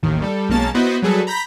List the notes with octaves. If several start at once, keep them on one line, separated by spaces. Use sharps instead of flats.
A1 D#2 D#3
G3 A4
B1 G#3 A#3 C#4 A5 A6
B3 E4 F#4 B4 C5 D#5
F#3 G3 G#4 A4 B4
A#5 B5 G6 A#6 B6